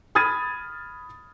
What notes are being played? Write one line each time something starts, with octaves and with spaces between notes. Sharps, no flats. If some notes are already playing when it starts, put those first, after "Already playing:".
B5 D#6 F6 G#6 A6 D#7